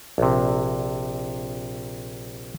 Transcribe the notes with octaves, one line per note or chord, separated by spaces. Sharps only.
A#1 C3